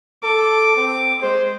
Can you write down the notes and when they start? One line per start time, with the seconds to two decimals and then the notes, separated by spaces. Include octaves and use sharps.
0.24 A4 D6
0.76 C4
1.22 G#3 C5